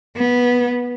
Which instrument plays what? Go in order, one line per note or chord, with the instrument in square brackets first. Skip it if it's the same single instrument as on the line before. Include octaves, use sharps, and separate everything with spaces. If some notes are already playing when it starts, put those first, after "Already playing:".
[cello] B3